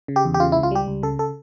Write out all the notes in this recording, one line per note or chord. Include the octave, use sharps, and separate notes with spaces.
C#3
G4
E2
G4
C#3 F4
E4
C#2
F4
G3 G4
C#2
C#3 A4
A4